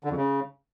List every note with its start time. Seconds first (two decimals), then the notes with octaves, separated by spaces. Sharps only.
0.04 D3
0.11 F2
0.17 C#3